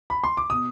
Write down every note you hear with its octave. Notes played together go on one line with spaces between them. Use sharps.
B5
C6
D6
B2 D#6